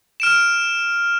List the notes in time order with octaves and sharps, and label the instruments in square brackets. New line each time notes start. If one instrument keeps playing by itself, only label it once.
[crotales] F6 D7 E7